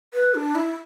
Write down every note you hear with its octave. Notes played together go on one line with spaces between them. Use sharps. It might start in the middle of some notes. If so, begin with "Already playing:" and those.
B4
D4
E4